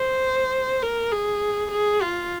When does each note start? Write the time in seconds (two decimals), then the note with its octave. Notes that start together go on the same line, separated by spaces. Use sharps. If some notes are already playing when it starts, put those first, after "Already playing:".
Already playing: C5
0.82 A#4
1.12 G#4
1.72 G#4
2.02 F4